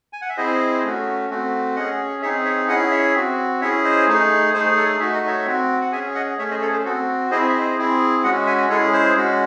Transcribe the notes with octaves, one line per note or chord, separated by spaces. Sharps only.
G#5
F#5
E5
C4 E4 G#4 C5 D#5
A3 C#4 F#4
A3 C4 F#4
C#4 G#4 D#5 F#5
C4 D#4 G#4 C#5 E5
C#5 E5
C#4 E4 G#4 D#5 F#5
C#5 E5
C4 F#4
C#4 E4 G#4 C#5 E5
C5 D#5
A3 D#4 G#4
A3 D#4 G#4 C5
A4 C#5
A3 D#4 F#4 E5
D#5
C#5 E5
C4 F#4
F#5
C#4 G#4 E5 G#5
D#5 F#5
A3 C#4 G#4 C#5 E5
C5 D#5
A4 C#5
G#4 C5
C4 F#4 A4
C4 E4 G#4 C5 D#5
E5
C5 D#5
C4 E4 G#4
G#3 C#4 F#4 D#5 F#5
E5 G#5
G#3 C#4 E4 G#4 A4 C#5
G#4 C5
G#3 C#4 F#4